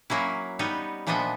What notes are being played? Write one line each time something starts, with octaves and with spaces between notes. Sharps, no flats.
F#3 A#3 C#4 E4
G3 B3 D#4
A#2 F3 B3 D4 D#5 E5